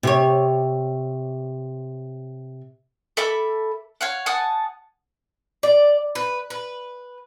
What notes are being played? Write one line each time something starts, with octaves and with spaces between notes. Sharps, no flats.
C3 G4 C#5
A4 E5 B5 D6
C#5 F5 F#5
F#5 G#5 A5 D#6
D5
B4
B4